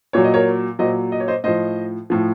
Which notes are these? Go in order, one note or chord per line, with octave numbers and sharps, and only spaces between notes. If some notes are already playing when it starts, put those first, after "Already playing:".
A#2 F#3 C#5
D#5
A#4 C#5
A#2 F#3 C5 D#5
D#5
C#5
C5 D#5
A2 F3 C5 D#5
A2 F3